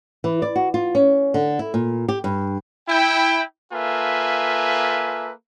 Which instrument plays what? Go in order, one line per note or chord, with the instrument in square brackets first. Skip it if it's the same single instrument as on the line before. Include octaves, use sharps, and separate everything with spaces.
[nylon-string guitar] E3
D5
F#4
F4
C#4
D3
E4
A#2
G4
G2
[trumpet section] E4 G5
A#3 F4 A4 B4 E5 G#5